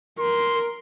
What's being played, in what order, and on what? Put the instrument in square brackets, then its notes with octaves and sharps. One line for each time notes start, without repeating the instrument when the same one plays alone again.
[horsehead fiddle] A#4 [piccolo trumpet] C6